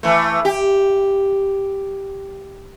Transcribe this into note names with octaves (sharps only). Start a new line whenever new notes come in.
E3 A3
G4